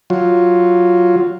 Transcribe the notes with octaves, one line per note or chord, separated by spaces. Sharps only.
F#3 F4